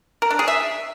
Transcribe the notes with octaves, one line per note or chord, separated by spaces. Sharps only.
A#4
D4
G#4
E5